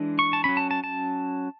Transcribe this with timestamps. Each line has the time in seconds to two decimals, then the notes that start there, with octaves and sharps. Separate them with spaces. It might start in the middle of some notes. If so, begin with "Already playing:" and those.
Already playing: E3 G#3 D4
0.19 C#6
0.33 A5
0.44 F#3 C#4 B5
0.57 A5
0.71 A5
0.84 A5